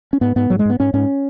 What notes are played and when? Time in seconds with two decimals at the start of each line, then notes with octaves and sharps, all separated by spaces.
0.13 C#4
0.21 G#2 B3
0.36 G#2 B3
0.50 G#2 F#3
0.59 G#3
0.65 G#2 B3
0.80 G#2 C#4
0.94 G#2 C#4